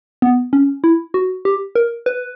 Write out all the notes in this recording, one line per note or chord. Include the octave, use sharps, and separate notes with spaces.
B3
C#4
E4
F#4
G4
A#4
B4